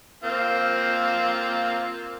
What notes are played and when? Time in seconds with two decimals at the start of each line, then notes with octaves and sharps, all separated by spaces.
0.23 A#3 C4 F4